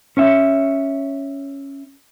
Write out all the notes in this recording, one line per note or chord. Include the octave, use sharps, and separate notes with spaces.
C#4 C#5 E5